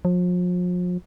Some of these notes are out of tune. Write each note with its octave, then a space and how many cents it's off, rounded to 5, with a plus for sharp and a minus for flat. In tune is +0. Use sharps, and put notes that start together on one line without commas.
F3 +40